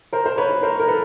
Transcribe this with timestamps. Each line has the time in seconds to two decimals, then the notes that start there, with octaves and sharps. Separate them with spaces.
0.13 A#4 C5
0.26 C5
0.38 B4 C#5
0.63 A#4 C5
0.80 A#4
0.88 A4 B4